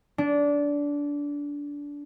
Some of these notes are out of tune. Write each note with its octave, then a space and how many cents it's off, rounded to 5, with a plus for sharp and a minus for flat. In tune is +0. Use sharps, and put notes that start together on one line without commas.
D4 -20